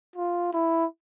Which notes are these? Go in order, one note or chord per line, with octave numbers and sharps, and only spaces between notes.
F4
E4